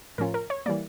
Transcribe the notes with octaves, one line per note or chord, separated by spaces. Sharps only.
A2 F3 C#4 F4 A#4
A#4
C#5
E3 G3 A#3 D5